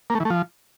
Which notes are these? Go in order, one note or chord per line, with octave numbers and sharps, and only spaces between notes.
A#3
A3
E3
A3
F3